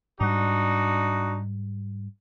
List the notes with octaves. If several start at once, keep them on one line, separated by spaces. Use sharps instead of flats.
G#2 G3 D4 D#4 F#4